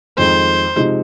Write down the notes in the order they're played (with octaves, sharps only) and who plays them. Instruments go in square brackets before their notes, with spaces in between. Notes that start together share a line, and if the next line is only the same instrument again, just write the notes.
[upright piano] F2 D#3 G#3 [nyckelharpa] C5
[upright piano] C3 F3 G#3 D#4